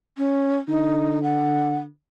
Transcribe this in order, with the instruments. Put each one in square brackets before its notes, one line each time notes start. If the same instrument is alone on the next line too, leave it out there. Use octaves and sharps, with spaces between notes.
[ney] C#4
[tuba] D3 [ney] D#4
[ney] F#5